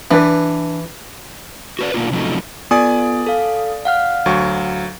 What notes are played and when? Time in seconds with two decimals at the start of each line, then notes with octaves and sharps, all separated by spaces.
0.11 E3 D4 B4
1.79 F#4 B4 D5
1.94 B2 D#3 A#3 D4 D#4 F4
2.12 C3 F3 F#3 A3 C#4 D#4
2.71 B3 F4 A4 D5 G#5 D#6
3.26 A4 F5
3.85 F5 F#5 F6
4.26 D2 F#3 C#6